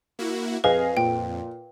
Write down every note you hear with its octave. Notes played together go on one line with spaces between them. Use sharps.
A#3 E4 F#4
F2 G#4 B4 D#5 F5
A#2 G5